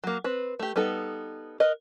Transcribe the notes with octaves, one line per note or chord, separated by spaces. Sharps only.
F#3 A#3
C4 B4
A3 G4
G3 B3 D#4 A4
A#4 B4 D#5